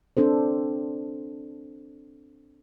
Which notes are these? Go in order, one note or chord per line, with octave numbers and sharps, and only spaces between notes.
C4 D4 A4 C5